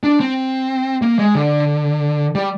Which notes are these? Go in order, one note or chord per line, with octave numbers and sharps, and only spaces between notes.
D4
C4
A#3
G#3
D3
G3